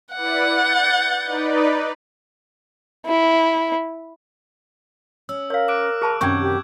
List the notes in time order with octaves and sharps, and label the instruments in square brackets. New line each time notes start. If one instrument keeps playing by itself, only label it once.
[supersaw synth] E4 B4 D5 [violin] F#5
[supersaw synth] G6 A6
D#4 B4 D5
[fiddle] E4
[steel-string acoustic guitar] C#4 [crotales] E6
[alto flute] A#4 [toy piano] C#5 F5
[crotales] D6 F#6 D7
[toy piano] G#4 A5 B5
[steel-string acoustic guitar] F#2 C3 D#3 [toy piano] C#4 G5 C#6 [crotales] G6 G#6
[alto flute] G4